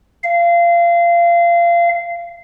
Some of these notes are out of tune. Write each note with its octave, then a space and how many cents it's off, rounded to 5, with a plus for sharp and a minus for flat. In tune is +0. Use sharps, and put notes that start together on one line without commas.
F5 -25